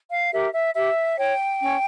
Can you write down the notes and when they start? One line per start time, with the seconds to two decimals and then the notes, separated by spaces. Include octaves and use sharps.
0.11 F5
0.32 G4 A#4 E5
0.54 E5
0.75 G4 E5
1.18 C#5 G5
1.61 C#4